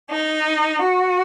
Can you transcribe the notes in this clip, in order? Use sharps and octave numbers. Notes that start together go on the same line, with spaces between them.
D#4
F#4